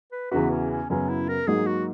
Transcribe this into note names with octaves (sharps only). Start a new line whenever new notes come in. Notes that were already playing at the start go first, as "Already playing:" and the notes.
B4
E2 C#3 E3 B3 F#4 B4
C#4
C#4
F#2 C#3 F#3 B3 C#4
E4
A#4
G#2 F#3 A#3 D#4 G#4
F#4